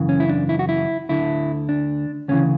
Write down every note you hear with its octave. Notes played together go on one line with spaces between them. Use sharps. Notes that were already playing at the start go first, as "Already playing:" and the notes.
Already playing: F#2 C#3 E3
C#4
E4
D4
E4
F#4
E4
D2 D3 E4
D4
D2 C#3 E3 C#4